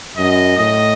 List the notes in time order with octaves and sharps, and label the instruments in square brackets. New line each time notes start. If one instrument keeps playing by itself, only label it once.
[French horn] F#2 [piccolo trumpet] D#5
[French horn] A2 [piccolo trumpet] D#5